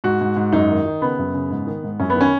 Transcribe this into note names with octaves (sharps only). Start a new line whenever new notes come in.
G#2 F#4
G#2
G#2
F#2 D#4
D#3
D#3
C#3 B3
F#2
C#3
G#2
D#3
G#2
F#2 C#4
B3
D#3
C#4